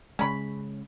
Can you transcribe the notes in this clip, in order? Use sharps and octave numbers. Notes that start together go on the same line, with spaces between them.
C#3 G#3 C#4 B5